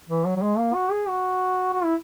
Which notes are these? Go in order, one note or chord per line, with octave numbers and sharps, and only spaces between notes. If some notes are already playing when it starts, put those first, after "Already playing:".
E3
F#3
F#3
G#3
A#3
F#4
G#4
F#4
F#4
E4